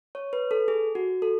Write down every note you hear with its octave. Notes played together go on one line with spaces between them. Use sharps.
C#5
B4
A4
G#4
F#4
A4